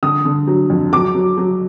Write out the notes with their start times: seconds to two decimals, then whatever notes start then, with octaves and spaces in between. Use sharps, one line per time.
0.03 D3 D#6
0.25 D3
0.47 F#3
0.70 F2
0.93 F#3 D6
1.15 F#3
1.38 F#3